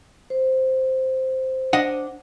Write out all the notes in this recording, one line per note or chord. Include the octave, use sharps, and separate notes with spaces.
C5
D4 D#5 F#5